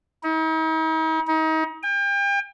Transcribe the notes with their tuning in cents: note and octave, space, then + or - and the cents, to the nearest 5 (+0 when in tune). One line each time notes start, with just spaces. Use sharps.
D#4 +45
D#4 +35
G5 +35